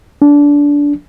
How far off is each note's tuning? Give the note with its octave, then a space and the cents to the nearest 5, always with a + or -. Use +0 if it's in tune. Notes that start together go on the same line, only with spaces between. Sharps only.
D4 -20